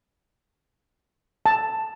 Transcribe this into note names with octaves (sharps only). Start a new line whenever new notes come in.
A5